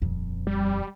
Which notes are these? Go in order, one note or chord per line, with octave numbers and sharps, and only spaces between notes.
D#1 F2
G3